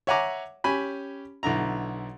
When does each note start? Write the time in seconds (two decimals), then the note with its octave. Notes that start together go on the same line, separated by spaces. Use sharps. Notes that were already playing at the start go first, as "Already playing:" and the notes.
0.07 C#5 E5 F#5 G#5 A#5 D6
0.64 C#4 G4 G#5 B5
1.43 B1 D3 E4 A#5